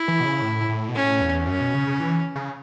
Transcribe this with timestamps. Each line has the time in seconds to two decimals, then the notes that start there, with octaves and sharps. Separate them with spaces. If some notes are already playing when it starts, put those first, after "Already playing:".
Already playing: E4
0.08 E3
0.20 B2
0.25 C#3
0.42 A2
0.69 A2
0.89 B2
0.95 A2 C#4
1.21 E2
1.47 F#2 C#4
1.61 B2
1.74 C#3
1.87 C#3
2.00 E3
2.35 C#3